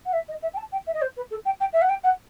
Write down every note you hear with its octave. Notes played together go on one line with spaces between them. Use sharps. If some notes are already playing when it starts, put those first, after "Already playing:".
F#5
E5
D#5
E5
G5
A5
G5
E5
D#5
C5
B4
A4
G5
G5
E5
F#5
G5
F#5